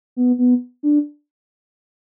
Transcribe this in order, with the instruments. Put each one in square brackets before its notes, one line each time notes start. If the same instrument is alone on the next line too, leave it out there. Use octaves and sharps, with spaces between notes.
[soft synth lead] B3
B3
D4